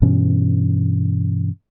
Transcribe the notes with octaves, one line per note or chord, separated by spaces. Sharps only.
G2 B2 E3 C#4